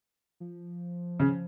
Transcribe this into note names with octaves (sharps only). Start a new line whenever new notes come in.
F3
C#3